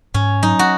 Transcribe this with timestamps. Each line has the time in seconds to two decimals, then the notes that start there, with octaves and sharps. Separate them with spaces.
0.14 G#2 C#4
0.43 F#3 D#4
0.59 F#4